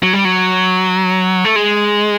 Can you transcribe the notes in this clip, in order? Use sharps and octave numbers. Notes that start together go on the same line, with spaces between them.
F#3
G3
F#3
A3
G#3